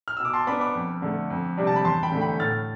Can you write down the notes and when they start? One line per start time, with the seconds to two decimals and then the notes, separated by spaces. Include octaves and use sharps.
0.08 F6
0.17 B2 E6
0.25 D6
0.33 A5 C6
0.47 B3 D4 B5 D6
0.61 B5 D6
0.75 F2
1.02 D3 A3
1.30 F2
1.57 C3 G3 D4
1.67 A5
1.76 B5
1.84 E2 A5 C6
2.03 G5 B5
2.12 D3 A3
2.21 G5 B5
2.40 A2 F6 A6